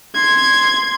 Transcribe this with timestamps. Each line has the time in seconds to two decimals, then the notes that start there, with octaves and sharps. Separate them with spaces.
0.15 C6 G#6